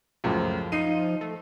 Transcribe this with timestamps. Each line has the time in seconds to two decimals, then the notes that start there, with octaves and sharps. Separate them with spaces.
0.24 C#2 F#2 A2 F3
0.72 D#4 C7 D#7
1.21 A3